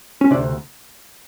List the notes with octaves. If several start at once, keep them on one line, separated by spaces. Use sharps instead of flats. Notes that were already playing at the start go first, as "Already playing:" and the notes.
C#4
D2 C3 D4